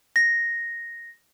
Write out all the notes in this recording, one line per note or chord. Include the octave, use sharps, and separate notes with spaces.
A#6